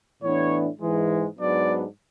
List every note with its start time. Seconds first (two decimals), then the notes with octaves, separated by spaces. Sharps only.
0.22 A2 E3 B3 D4 C#5
0.81 G#2 E3 G#3
1.39 G#2 F#3 B3 D4 D5